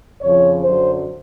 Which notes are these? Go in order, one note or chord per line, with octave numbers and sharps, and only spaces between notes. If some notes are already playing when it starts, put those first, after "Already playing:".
F2 C#3 F3 C#5
F#2 D3 F#3 C5